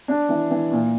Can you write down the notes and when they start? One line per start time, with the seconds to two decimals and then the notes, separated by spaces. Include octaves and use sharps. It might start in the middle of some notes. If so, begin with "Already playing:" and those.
0.08 D4
0.29 E3
0.50 E3
0.72 A#2